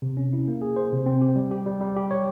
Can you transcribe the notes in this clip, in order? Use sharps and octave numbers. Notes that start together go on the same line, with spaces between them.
C3
C#4
E4
A#3
G#4
C5
C3
C4
G4
G3
G4
G3
G3
G4
C#5